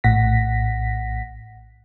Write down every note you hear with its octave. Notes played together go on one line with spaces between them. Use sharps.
A#1 A2 F#5 A#6 B6